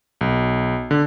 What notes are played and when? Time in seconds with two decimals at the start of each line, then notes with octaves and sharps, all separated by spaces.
0.21 B1
0.91 D3